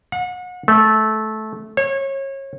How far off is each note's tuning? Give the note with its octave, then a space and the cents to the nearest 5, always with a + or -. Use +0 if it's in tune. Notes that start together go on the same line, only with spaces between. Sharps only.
F#5 -35
A3 -15
C#5 -30